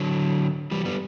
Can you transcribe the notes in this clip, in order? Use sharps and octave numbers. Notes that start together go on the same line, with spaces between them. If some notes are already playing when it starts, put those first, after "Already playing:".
Already playing: D3 F#3
E3 G3
G3 B3